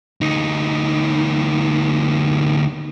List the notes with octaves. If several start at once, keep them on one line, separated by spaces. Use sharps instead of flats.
D2 D#4